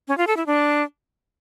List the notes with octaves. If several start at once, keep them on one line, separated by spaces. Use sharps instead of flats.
C#4
F4
A4
E4
D4